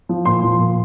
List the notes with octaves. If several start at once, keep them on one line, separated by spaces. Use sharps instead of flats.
F3
A#2 C6
F3
A#2